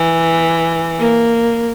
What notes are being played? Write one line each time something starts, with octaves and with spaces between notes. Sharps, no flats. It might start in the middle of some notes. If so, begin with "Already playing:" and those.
Already playing: E3
A#3